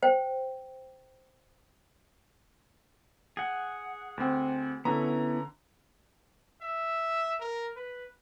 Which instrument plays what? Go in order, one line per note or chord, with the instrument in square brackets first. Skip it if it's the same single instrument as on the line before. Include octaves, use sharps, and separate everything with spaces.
[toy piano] C5 G5
[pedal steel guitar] G#4 F#5
[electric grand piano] D2 C4
[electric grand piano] D3 A#5 [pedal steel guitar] B3 C#4 E4
[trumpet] E5
A#4
B4